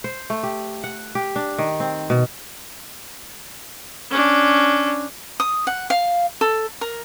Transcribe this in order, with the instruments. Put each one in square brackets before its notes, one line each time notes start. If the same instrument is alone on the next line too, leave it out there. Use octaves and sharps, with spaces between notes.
[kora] C5
A3
G4
F#5
G4
D4
D#3
C4
B2
[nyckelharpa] C#4 D4
[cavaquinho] D#6
F#5
F5
A4
A#4